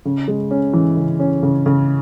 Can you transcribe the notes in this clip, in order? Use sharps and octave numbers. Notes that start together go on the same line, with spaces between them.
C#3
G#3
C#4
E3
C#3
C#4
C#3
C#3